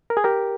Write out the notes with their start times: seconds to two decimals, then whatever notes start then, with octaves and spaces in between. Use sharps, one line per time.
0.10 A#4
0.17 G#4
0.24 G4 A#4